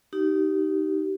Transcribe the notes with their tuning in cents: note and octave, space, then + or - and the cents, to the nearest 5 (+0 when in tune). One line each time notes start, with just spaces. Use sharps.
D#4 +0 G4 -25